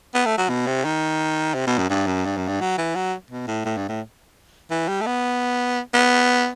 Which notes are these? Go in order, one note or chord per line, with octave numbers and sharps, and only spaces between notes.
B3
A3
F#3
B2
C3
D#3
C3
B2
F#2
G2
F#2
G2
F#2
G2
F#3
E3
F#3
B2
A2
A2
G2
A2
E3
G3
A3
B3
B3